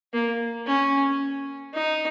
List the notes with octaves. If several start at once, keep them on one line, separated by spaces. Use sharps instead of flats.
A#3
C#4
D#4